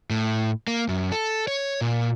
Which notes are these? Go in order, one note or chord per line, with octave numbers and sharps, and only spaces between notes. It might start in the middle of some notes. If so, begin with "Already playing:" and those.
A2
A#3
F#2
A4
C#5
A#2